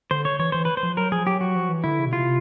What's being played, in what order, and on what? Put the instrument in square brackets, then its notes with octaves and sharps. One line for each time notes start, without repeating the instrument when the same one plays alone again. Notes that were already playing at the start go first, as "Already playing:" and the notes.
[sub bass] D3 [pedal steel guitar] C5
[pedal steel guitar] C#5
[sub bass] E3 [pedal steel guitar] C#5
[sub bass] E3 [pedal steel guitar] C5
[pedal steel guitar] B4
C5
[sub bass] F3
[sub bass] F#3 [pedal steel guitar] A#4
[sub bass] F3 [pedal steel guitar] G#4
[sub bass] F#3 [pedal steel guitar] G4
[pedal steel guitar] F#4
[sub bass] F3
E3
[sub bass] D3 [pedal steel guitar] E4
[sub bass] C#3
B2
[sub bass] C3 [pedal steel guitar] F4